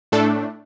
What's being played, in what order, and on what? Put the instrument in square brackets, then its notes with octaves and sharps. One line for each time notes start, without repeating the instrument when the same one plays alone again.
[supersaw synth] A2 A3 D4 A4